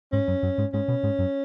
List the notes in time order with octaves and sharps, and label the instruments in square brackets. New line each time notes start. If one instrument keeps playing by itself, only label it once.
[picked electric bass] G#2 G#3 [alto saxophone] C#4
[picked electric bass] F#2 F#3
F#2 F#3
G#2 G#3
[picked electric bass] G#2 G#3 [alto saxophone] C#4
[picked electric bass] B2 B3
G#2 G#3
F#2 F#3